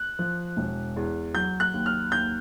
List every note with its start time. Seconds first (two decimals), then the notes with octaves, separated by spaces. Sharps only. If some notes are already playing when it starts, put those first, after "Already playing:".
Already playing: F#6
0.19 F3
0.57 E1
0.96 E2
1.34 F#3 G6
1.60 F#6
1.73 D#2
1.86 F6
2.12 D#2 G6